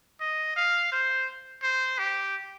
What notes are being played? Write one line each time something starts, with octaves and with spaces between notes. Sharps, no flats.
D#5
F5
C5
C5
G4